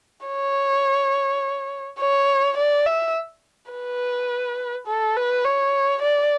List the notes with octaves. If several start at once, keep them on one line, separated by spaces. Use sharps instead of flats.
C#5
C#5
D5
E5
B4
A4
B4
C#5
D5